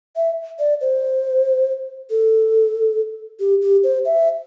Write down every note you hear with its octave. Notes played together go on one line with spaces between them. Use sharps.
E5
D5
C5
A4
G4
G4
C5
E5